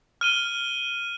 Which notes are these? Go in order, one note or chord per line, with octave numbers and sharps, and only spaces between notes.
F6 D#7 G7